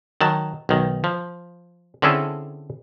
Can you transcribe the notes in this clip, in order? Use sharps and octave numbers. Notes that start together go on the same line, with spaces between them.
D#3 F#3 A5
B1 D#3
F3
D3 C4 C#4 E4 G#4 A4